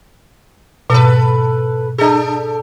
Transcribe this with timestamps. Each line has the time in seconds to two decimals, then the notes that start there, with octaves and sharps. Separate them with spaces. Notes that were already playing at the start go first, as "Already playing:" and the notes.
0.90 G#2 B2 A4 B4
1.98 D4 G#4 A4